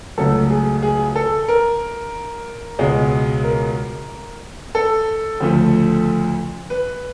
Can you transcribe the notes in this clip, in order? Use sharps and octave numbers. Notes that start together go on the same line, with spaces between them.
C#2 C#3 F#3 A3 A4
G#4
G#4
A4
A#4
C#2 B2 G#3
A#4
A4
D2 C#3 F3 A3
B4